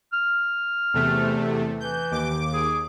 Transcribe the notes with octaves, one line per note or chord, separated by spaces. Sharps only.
F6
E2 C3 A3
E3 G6
D#2 D6
G#4